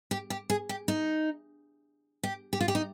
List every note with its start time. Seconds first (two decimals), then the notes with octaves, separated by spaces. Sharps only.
0.11 G4
0.30 G4
0.50 G#4
0.69 G4
0.88 D#4
2.23 G4
2.53 G4
2.60 F4
2.68 G4
2.75 D#4